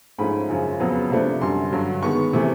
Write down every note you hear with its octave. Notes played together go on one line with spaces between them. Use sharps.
G#2 F3 A3 C#4 B5
F#2 C#3 F3 G#3 C#4
F2 C#3 F#3 B3
C3 F3 A3 D4
F#2 D3 G3 C6
G2 D3 F#3
D#3 G#3 B3 C#6
C3 E3 A3